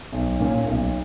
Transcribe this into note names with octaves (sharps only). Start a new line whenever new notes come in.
B1
A#2 A#3 C#4
B1